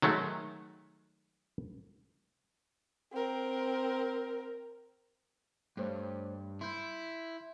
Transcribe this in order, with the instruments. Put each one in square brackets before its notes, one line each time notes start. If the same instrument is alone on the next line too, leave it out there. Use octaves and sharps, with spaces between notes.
[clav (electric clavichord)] D#3 F#3 G#3 A3
[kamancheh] C4 A#4
[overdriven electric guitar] G2 [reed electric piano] A3 C5 C#5
[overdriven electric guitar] E4 [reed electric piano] C6 G6